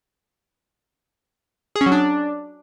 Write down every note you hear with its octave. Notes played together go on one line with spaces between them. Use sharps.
G#4
C#4
F#3
D4